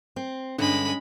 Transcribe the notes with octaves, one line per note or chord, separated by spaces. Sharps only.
C4
G2 D3 G#3 C#4 B5